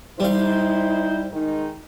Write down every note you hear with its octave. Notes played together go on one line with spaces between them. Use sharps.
G3 D#4 E4 C5 F5
D#3 G#3 D#4